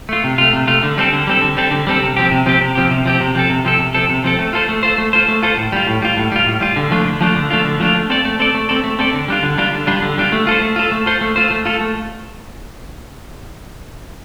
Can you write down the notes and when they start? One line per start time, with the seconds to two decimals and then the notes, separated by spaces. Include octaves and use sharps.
0.09 A3 F4
0.24 C3
0.38 A3 F4
0.53 C3
0.67 A3 F4
0.83 D3
0.98 G3 C4 A4
1.13 D3
1.27 G3 C4 A4
1.42 D3
1.57 G3 C4 A4
1.71 D3
1.87 G3 C4 A4
2.01 C3
2.16 F3 C4 G4
2.31 C3
2.46 F3 C4 G4
2.61 C3
2.75 F3 C4 G4
2.91 C3
3.06 F3 C4 G4
3.20 C3
3.35 F3 C4 A4
3.49 C3
3.65 F3 C4 A4
3.79 C3
3.95 F3 C4 A4
4.09 C3
4.24 F3 C4 A4
4.39 A3
4.53 F4 A4 C5
4.69 A3
4.83 F4 A4 C5
4.98 A3
5.13 F4 A4 C5
5.28 A3
5.42 F4 A4 C5
5.57 A2
5.72 G3 F4
5.87 A2
6.02 G3 F4
6.17 A2
6.32 G3 F4
6.46 A2
6.61 G3 F4
6.76 D3
6.91 F3 A3 D4 F4
7.06 D3
7.21 F3 A3 D4 F4
7.36 D3
7.50 F3 A3 D4 F4
7.65 D3
7.80 F3 A3 D4 F4
7.95 A3
8.10 C4 A4 D5
8.25 A3
8.39 C4 A4 D5
8.54 A3
8.69 C4 A4 D5
8.84 A3
8.99 C4 A4 D5
9.13 D3
9.28 G3 D4 F4
9.43 D3
9.58 G3 D4 F4
9.73 D3
9.87 G3 D4 F4
10.02 D3
10.18 G3 D4 F4
10.32 A3
10.47 F4 A4 C5
10.62 A3
10.76 F4 A4 C5
10.92 A3
11.06 F4 A4 C5
11.21 A3
11.36 F4 A4 C5
11.51 A3
11.65 F4 A4
11.81 A3